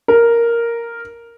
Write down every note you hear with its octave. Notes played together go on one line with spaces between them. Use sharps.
A#4